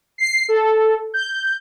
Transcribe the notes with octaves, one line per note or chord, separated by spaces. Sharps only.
C7
A4
G6